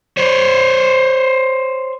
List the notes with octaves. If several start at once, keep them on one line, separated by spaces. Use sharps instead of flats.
C5 C#5